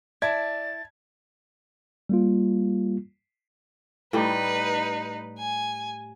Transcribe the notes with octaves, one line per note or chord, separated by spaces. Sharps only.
E4 D5 A5 G#6 A6
G3 A#3 F4
A2 G3 D#4 G4 B4
G#5